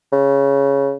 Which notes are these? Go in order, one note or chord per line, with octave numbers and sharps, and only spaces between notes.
C#3